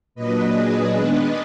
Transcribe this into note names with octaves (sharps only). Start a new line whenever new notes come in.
A#2 F#3 D4 B4 D#5
G#4 B4
D#3 G#3 B3 D4 B4 D#5